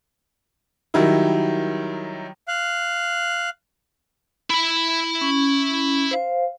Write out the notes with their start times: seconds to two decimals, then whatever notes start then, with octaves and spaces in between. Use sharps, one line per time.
0.94 D#3 F#3 G3 D#4 E4
2.48 F5 F#6
4.50 E4 B5
5.21 C#4
6.11 C5 F5